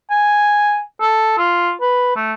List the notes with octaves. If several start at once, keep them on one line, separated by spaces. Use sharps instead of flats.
G#5
A4
F4
B4
A3